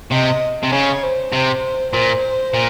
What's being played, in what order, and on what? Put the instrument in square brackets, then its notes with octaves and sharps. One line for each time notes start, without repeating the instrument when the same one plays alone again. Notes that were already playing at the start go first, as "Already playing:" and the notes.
[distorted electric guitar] C3 [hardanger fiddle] D#5
[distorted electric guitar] C3
[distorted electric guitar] C#3 [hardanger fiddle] C#5
[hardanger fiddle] C5
[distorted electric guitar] C3 [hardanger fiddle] C5
[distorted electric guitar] A#2 [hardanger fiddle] C5
[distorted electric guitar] A#2